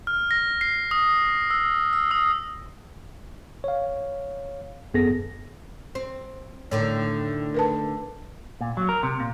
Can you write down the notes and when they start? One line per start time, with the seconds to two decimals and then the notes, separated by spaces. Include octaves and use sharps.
0.07 F6
0.31 A#6
0.61 C7
0.91 D#6
1.51 E6
1.93 E6
2.11 D#6
3.64 C#5 F5
4.94 G#1 F#2 B3 G#4 A4 A#6
5.95 C4
6.71 A2 D3 D#3 C#5
7.54 A#4 B4 A5
8.61 A#2
8.77 F#3
8.89 A#4
9.03 C3
9.20 A#2